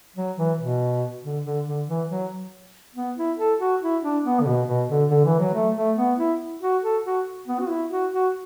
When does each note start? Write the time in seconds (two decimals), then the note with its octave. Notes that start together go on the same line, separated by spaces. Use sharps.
0.16 F#3
0.37 E3
0.59 B2
1.24 D3
1.45 D3
1.67 D3
1.87 E3
2.10 F#3
2.95 B3
3.17 E4
3.39 A4
3.60 F#4
3.82 E4
4.03 D4
4.25 B3
4.40 D3
4.46 B2
4.67 B2
4.89 D3
5.11 D3
5.25 E3
5.39 F#3
5.54 A3
5.76 A3
5.97 B3
6.18 E4
6.61 F#4
6.83 A4
7.05 F#4
7.48 B3
7.60 F#4
7.69 E4
7.90 F#4
8.13 F#4